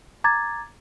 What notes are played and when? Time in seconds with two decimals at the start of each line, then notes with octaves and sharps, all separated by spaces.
0.24 A#5 D6 G#6 A6